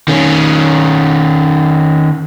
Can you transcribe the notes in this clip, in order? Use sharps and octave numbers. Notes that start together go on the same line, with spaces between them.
D#3 C#4